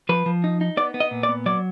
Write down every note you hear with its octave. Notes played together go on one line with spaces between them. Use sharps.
F3 B4
F3
D#4
D#4
B3 D5
B3
D#5
A#2
D5
B3
F#3 D5